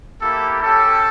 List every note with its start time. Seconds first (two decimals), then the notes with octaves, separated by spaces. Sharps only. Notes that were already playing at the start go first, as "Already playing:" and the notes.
0.22 A#3 E4 G4 A4
0.62 C#4 G4 A4